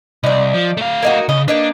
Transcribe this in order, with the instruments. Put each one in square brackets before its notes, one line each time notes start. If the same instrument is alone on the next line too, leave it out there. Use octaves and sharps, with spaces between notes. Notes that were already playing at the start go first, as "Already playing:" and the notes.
[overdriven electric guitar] C2 [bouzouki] D#4 D5
[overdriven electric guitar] F3
A3 F5
[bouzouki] A#3 D#4 F#4
[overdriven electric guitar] C#3 [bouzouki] D#5
[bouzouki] A#3 D#4 B4 [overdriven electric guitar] D4